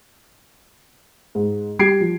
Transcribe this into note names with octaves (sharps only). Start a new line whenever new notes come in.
G#2
G3 G4 G#6 C7 D7
F3